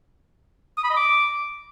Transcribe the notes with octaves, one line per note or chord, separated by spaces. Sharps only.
D#6
B5
D#5
D6